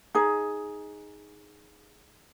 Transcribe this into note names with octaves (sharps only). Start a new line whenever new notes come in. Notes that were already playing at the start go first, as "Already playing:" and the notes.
D#4 G#4